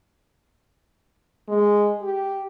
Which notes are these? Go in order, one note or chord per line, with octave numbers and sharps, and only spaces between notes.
G#3
G4